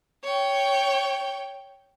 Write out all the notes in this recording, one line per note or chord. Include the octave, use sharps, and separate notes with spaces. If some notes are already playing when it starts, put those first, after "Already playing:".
C#5 G5